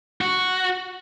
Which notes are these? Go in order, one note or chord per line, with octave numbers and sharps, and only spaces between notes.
F#4